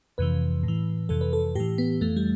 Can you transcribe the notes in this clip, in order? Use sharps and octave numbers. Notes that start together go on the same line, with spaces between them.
F2 C3 E3 B4
A2 E3
F2 C3 E3 A4
B4
A4
A2 E3 G4
B3
F2 E3 A3
G3